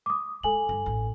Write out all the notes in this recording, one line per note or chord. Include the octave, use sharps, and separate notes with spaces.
D6 D#6
G#3 A4 G#5 F#7
G2
A1